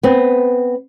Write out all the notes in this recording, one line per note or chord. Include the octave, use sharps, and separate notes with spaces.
B3 C4